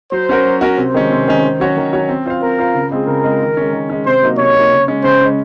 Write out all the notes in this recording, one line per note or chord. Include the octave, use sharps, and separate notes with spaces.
F#3 C5
C#4 F#4 A#4
F#3
C#4 F#4 A#4
C3 C5
D#3 G#3 C#4
C3
D#3 G#3 C#4
D#3
F#3 C#4 F#4 C#5
D#3
F#3 C#4 F#4 C#5
C4
F4 C5 F5
C4 A#4
F4 C5 F5
C#3
G#3 C4 F4 G#4
C#3 A#4
G#3 C4 F4 G#4
D#3
G#3 C#4
D#3
G#3 C#4
C3 C5
F#3 A#3 D#4
C3 C#5
F#3 A#3 D#4
C#3
G#3 C#4
C#3 C5
G#3 C#4